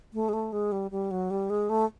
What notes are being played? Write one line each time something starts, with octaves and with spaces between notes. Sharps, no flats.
A3
G#3
A3
G#3
G3
G3
F#3
G3
G#3
A3